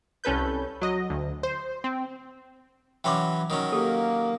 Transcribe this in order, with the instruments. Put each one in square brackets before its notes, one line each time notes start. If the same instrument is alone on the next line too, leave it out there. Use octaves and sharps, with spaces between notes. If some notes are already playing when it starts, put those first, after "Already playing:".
[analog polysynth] C2 C#4 A4 B4 G6
F#3 D#5
D2
C5
C4
[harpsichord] E3 F#3 C#4 [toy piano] G5 C6 D6
[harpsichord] D#3 F#3 C#4
[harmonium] A#3 [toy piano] G4 A4